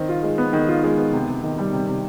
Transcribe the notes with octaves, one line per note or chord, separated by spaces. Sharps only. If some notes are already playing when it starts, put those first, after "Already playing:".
Already playing: D#3 C4
F4
G#3
B3
D#3
F4
G#3
B3
C3
C3
D#3
G3
C3
C3